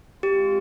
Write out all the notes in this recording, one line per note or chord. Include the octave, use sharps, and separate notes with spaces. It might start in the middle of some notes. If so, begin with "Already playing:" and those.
G#3 C4 F4 G4